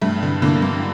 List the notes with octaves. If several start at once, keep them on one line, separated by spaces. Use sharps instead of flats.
G2 A3
D3
D3 A#3
G2